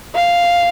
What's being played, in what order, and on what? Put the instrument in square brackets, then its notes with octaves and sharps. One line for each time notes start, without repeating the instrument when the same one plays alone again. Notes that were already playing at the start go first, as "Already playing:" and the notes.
[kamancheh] F5